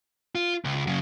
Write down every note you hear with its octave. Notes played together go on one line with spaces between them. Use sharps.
F4
C#2
F#2 C#3